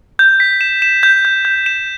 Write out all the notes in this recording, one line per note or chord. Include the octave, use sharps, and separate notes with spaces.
G6
B6
E7
E7
G6
G6
G6
E7